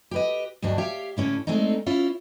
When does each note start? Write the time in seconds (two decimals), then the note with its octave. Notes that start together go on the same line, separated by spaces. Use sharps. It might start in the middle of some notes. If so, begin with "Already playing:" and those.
0.11 G4 B4 D#5
0.62 D2 G2 F#3 D4 D#5
0.78 G4 C#5 E5 F5
1.17 A2 D3 C#4 E4
1.47 G#3 A3 C4 D4 D#4
1.86 C#4 E4 F4